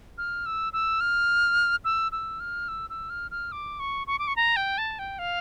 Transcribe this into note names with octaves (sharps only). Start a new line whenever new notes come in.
F6
E6
E6
F6
E6
E6
F6
E6
E6
F6
F6
D6
C#6
C#6
D6
C#6
A#5
G5
A5
G5
F5